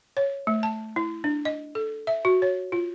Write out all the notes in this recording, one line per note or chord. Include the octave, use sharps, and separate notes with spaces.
C#5
A3
A5
E4
D4
D#5
A4
E5
F#4
C#5
F4